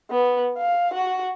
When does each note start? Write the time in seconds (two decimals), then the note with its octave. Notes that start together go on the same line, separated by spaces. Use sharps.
0.11 B3
0.58 F5
0.94 F#4